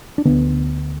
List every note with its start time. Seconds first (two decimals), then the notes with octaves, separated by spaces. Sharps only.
0.18 D4
0.25 D2 D3 B3